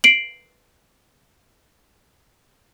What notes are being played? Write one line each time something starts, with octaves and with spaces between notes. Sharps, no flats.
C7 D7 F#7